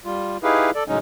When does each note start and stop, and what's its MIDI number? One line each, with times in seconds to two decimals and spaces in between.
0.05 0.37 55
0.05 0.37 65
0.43 0.71 63
0.43 0.71 64
0.43 0.71 67
0.43 0.71 68
0.43 0.71 71
0.43 0.71 77
0.75 0.84 69
0.75 0.84 74
0.88 0.99 45
0.88 0.99 49
0.88 0.99 54
0.88 0.99 56
0.88 0.99 61
0.88 0.99 63